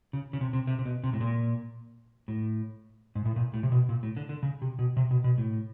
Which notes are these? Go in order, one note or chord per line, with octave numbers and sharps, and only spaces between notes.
C#3
C#3
C3
C3
C3
C3
B2
C3
A2
A#2
A2
G#2
A2
A#2
A2
C3
B2
A#2
A2
D3
D3
C#3
C3
B2
C3
B2
B2
A2